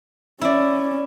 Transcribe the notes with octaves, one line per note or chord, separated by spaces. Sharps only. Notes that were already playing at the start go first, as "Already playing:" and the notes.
C#4 E4 D5